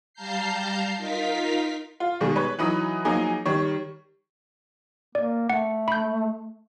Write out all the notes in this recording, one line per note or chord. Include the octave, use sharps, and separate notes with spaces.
G3 F5 A5 A#5 G6 C7
D#4 F4 A#4 F5 B6
F4
B2 D#3 G3 G#3
B4 C#5
E3 F#3 D#4 B5 D#6
F3 F#3 A#3 D#4 G#4
D#3 G3 C#5
A#3 D5
A3 F#5
B5 G6